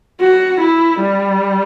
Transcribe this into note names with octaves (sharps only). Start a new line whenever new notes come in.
F#4
E4
G3